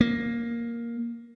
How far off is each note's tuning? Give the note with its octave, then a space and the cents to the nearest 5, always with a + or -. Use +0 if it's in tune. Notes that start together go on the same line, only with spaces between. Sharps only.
A#3 +5